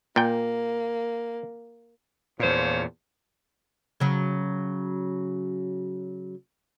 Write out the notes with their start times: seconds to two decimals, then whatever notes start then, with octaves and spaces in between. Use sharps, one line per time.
0.16 A#2 A#3 G5
2.40 E2 A#2 F3 C5 C#5
4.00 C#3 F#3